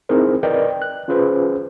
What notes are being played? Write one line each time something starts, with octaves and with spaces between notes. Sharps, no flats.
C4 D#4 E4 G#4 A#4 C5
A#4 B4 D5 D#5 G5
F#6
C#4 F4 G#4 B4 C5